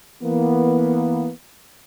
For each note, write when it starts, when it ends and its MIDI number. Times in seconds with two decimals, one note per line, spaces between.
0.23 1.29 52
0.23 1.29 58
0.23 1.29 59